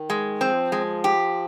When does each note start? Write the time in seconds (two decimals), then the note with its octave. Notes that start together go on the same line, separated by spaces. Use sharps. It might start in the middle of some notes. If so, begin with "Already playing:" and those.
Already playing: D#3
0.10 G#3
0.41 F3 C4
0.72 G#3
1.04 G4